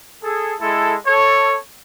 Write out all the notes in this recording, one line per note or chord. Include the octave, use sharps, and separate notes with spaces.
G#4 A4
G#3 E4 A4
A4 C#5